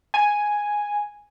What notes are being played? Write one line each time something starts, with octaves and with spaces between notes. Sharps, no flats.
G#5